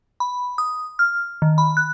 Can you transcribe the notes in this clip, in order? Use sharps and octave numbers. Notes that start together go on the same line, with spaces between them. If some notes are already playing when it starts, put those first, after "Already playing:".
B5
D#6
F6
D#3
B5
F#6